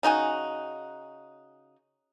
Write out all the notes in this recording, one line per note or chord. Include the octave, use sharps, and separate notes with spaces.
C#3 D#4 F#4 G#5